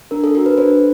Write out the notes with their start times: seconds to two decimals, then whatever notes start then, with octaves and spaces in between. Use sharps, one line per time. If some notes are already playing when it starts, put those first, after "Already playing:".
0.11 D4 A#4
0.24 A4
0.35 F#4 A4 A#4
0.46 B4
0.58 D4 C5